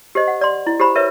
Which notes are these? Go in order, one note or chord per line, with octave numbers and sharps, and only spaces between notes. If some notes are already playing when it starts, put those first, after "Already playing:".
G4 C5 D#5
F#5
D5 C6
E4
G4 C5 B5
A#4 B4 C#5 E5